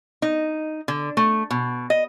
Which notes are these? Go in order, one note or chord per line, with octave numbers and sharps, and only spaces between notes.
D#4
D3
A3
B2
D#5